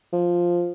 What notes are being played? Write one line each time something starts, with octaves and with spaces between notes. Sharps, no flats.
F3